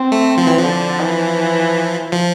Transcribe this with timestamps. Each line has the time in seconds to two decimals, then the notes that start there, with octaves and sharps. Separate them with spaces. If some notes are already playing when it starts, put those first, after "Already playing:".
Already playing: C4
0.12 A3
0.37 F3
0.47 E3
0.58 D3 F3
0.99 E3
2.12 F3